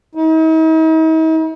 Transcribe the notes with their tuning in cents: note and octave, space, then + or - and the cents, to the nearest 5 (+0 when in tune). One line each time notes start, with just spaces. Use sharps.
D#4 +45